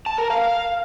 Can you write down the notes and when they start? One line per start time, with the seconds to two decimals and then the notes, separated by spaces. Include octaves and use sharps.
0.06 A5
0.18 A#4
0.30 F5